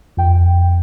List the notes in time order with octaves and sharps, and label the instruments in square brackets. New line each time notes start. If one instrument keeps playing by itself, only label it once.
[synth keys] F2 G5